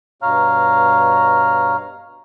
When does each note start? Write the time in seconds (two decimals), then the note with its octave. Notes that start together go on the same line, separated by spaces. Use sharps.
0.22 G2 B2 C#5 F5 A#5 F6